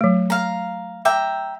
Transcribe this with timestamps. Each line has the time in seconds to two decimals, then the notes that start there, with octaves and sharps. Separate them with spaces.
0.01 F#3 A3
0.30 F5 A#5
1.05 E5 G5 A#5 D6